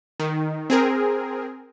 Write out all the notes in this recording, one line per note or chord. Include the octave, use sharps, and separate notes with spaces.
D#3
C4 G#4 A#4